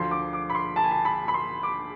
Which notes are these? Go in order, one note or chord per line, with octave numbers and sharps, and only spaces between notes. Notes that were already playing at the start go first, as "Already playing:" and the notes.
Already playing: D2 D3 F3 C6
D6
D6
B5
C6
A5
G#5
A5
B5
B5
C6
D6